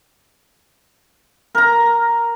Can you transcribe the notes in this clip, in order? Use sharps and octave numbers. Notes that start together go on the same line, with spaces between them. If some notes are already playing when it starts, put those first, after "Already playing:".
A#4 A#5